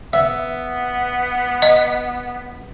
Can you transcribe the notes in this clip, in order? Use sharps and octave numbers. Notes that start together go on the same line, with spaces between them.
B3 E5
D#5